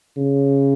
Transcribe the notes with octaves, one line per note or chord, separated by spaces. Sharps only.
C#3